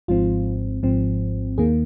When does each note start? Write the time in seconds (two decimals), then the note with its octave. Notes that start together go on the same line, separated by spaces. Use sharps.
0.08 G#1 G#2 F3 C4 F4
0.83 G#1 G#2 F3 C4
1.58 D#2 D#3 A#3 G#4